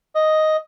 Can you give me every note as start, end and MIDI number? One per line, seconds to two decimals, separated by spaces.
0.15 0.57 75